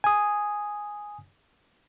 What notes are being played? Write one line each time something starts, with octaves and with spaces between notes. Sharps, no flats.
G#5 D#6